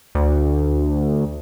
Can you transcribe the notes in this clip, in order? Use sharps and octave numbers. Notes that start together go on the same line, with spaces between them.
D2